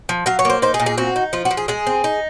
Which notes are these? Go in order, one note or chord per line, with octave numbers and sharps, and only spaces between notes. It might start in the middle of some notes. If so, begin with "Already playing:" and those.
F3
F#3 F5
C#5
A#3 C5
D#4 C5
G#4
A#2
G#4
C4 F#4
D#4
F3 F4
F#4
F3
G#4
G#3 G#4
C4
D#4